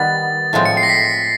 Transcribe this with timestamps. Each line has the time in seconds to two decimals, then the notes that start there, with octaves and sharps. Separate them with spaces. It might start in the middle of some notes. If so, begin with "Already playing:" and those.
Already playing: D#3 G3 B3 A6
0.53 A2 F3 G#3 C4
0.65 C#7
0.77 C7
0.83 A#6
0.89 B6